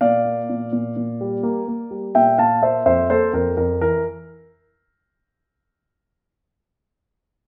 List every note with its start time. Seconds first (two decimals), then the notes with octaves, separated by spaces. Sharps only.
0.01 A#2 D5 F5
0.25 A#3
0.49 A#2
0.72 A#2
0.96 A#2
1.21 G3
1.43 A#3
1.68 A#3
1.91 G3
2.15 A#2 E5 G5
2.38 A#2 F5 A5
2.62 A#3 C5 E5
2.86 F2 C5 E5
3.10 A#3 A4 C5
3.33 F2 A#4
3.57 F2 A#4
3.81 E3 A#4